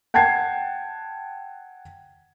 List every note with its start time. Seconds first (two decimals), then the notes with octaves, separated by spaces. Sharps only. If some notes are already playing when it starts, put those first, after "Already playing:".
0.14 F#5 G5 A5 G#6 C7